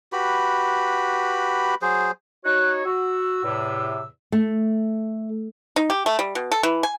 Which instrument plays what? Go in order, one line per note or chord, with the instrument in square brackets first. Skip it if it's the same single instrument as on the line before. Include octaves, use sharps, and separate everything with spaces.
[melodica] F#4 G4 B4 B5
F#3 G#4 C5
[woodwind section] D#4 F#4 C#5 [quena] F#6
[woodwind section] F#4 [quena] E6
[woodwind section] E2 A2 C3
[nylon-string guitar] A3
[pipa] D#4
G4
A3
G3
B2
A4
E3
G#5